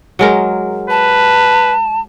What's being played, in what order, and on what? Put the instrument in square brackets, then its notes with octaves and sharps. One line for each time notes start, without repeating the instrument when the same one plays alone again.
[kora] F#3 G#3 A#4
[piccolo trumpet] B4 [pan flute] A5